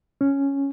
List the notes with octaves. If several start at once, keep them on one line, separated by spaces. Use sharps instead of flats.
C#4